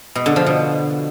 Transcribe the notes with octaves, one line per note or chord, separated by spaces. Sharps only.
B2
D3
F3
B2